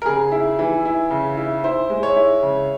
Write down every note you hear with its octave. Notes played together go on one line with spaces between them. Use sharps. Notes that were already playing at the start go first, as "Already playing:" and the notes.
A#4
C#3 G#4
E4
E3
E4
C#3
E4
E4 C5
G#3
C#5
E4
C#3